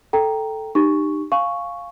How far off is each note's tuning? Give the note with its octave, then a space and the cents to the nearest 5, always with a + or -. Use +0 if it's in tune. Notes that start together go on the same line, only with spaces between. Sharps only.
A4 +0 G5 +0 A#5 +0
D#4 -30 G4 +0 C#6 +0
F5 +0 G#5 +20 C#6 +0